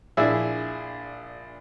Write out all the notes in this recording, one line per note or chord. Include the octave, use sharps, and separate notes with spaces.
A#1 D4 E4 G#4 E5